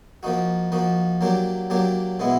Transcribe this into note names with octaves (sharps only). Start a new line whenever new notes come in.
F3 A#3 D#4 F#4
F3 A#3 D#4 F#4
F#3 A#3 D4 G4
F#3 A#3 D4 G4
B2 G#3 B3 E4